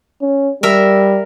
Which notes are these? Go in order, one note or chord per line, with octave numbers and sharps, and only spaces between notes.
C#4
G3 A#4 E5